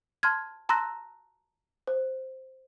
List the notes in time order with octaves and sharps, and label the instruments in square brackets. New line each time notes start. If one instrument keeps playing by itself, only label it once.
[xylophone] A5 C6 F6 G#6
A5 A#5 C6 E6 F#6 A#6
C5